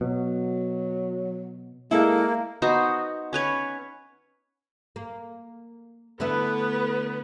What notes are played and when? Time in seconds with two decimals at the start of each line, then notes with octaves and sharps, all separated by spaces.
0.01 B2 F#3
1.91 G#3 A#3 E4 A4
2.62 B3 D#4 F#4 C5
3.33 C#4 B4 C#5
4.96 A#3
6.20 D3 A3 B3 E4 B4